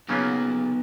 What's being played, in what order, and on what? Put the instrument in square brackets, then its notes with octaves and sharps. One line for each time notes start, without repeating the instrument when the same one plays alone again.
[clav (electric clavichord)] C#3 F#3 A#3 C#4 F4 [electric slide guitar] B3 D#4